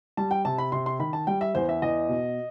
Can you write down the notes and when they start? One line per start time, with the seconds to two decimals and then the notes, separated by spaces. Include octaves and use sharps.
0.17 G3 A5
0.31 G5
0.45 C3 A5
0.58 B5
0.72 C3 C6
0.86 C6
0.99 D#3 B5
1.13 A5
1.27 G3 G5
1.41 E5
1.55 E2 C5
1.69 E5
1.82 E2 D#5
2.09 B2